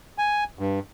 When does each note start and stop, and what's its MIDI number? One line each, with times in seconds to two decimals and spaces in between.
0.18 0.44 80
0.59 0.80 43